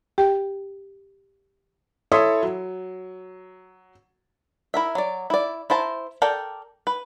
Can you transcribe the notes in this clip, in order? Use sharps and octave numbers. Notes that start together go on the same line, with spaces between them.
G4 G5
E4 A4 C#5 E5 C6 D#6
F#3
E4 A#4 E5
F#3 D5
E4 D5
E4 C5 A5 A#5
A4 A#4 D5 G5
B4